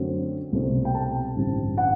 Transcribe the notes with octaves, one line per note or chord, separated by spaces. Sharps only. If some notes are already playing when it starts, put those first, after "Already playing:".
Already playing: F#2 D3 F#3 A3 C4
C2 B2 A3 C4
G5
A5
A1 G2 D3 G3 C4
F#5